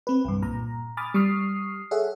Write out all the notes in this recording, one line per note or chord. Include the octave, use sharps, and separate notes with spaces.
C4 B4
C2 G2
A#2 A#5
G#5 B5 D6 D#6 F6 A6
G3 C#6 D#6 F6 C7
G#4 A4 C#5 E5 F#5